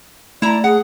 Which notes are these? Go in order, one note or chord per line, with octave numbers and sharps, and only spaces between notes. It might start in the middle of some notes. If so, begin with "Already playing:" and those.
A3 E4 D5 A#5
G#4 F#5